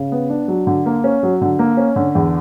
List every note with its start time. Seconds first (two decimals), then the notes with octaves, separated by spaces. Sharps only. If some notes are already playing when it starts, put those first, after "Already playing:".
Already playing: C#3
0.12 B3
0.30 D4
0.48 F#3
0.67 D3
0.86 A#3
1.04 C#4
1.23 F#3
1.41 D3
1.59 A#3
1.77 C#4
1.96 D3
2.15 E2